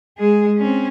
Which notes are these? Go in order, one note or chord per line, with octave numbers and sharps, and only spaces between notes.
G#3 G#4
C4 C#4